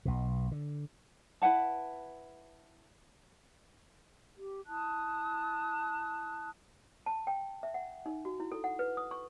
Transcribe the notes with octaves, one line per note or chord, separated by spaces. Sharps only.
B1 B2
D3
E4 B4 F#5 A5
G4
E4 A5 D#6 F#6
A5
G5
E5
F#5
D#4
F#4
E4
A4
F#5
B4
D#6
C#6